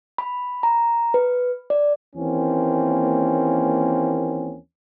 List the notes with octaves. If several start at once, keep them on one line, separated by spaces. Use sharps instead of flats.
B5
A#5
B4
D5
D#2 E3 A#3 C4 C#4